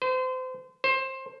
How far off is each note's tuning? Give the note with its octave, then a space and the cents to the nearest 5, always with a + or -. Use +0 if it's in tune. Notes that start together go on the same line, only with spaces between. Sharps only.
C5 -30
C5 +20